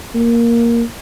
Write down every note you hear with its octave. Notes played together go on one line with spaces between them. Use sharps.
A#3